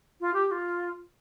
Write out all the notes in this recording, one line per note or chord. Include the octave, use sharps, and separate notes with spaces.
F4
G4
G4
F4